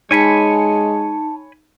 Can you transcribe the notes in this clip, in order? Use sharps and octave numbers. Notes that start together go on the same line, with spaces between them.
G#3 D#4 C#5 G#5 A5 B5 C#7